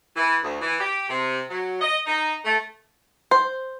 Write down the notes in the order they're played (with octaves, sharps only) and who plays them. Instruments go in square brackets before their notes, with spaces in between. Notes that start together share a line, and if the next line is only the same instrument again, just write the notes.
[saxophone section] E3
D2
E3
G4
C3
F#3
D#5
D#4
A3
[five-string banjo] C5